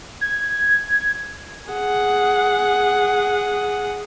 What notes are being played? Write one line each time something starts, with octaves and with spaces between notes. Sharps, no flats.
G#6
G#4 F#5